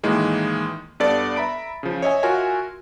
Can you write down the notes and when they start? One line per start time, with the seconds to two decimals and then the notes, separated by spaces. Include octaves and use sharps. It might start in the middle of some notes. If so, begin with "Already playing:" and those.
0.03 A2 D#3 E3 G#3 A#3
1.00 G2 B3 A4 D5 A5 A6
1.36 E5 A#5 B5 D7
1.83 C#3 F3
2.02 C#5 D#5 E5 G#5
2.23 F4 F#4 A#4 E5 G#5